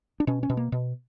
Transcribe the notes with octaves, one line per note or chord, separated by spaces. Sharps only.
D4
B2 C#4
C#4
B2
A#3
B2